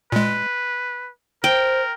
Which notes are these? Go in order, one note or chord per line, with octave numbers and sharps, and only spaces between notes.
A#2 G#3 B4
A#4 C5 G5